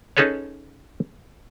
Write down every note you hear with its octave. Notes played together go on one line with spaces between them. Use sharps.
C#4 D#4 G#4 A4 B4 C#5